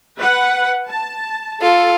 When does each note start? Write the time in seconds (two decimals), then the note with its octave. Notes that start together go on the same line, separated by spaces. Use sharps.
0.18 B4 F#5
0.89 A5
1.62 F4 A4